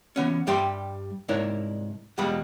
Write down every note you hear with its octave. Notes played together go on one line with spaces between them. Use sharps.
E3 B3 C#4
G2 G3 G4 E5 C6
C2 G#2 D4 E4 A#4 C#5
E2 B2 F3 G3 G#3 B5